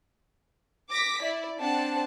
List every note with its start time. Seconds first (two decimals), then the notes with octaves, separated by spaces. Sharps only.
0.91 D6 A#6 B6
1.23 E4 D5
1.60 C4 D4 F#5 A5